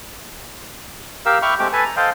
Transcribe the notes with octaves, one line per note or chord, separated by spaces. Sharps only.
G4 A#4 F5 E6
E5 G5 B5 C#6 D6 F6
G#3 A3 C4 G4 D6
A4 B4 G#5 A5
A#5
A4 C5 D#5 F5 G5